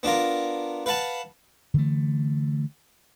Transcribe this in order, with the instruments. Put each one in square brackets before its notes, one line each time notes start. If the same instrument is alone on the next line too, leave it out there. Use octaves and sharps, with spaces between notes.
[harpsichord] B3 D4 F4 A#4
B4 F5 F#5 A5 B5
[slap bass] D3 E3 A3